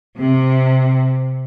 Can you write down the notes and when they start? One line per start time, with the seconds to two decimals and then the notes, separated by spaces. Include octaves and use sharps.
0.18 C3